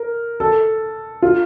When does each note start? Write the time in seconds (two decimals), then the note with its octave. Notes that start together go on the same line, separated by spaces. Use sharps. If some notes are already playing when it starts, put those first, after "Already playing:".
Already playing: A#4
0.40 A4
1.22 F4